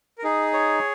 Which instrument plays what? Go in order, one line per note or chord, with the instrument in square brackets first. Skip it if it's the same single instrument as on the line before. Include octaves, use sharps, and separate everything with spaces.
[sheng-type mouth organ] A#4
[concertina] D#4 [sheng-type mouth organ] G#4
[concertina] C#5